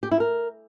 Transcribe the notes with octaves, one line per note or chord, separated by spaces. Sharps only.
G4
E4
A#4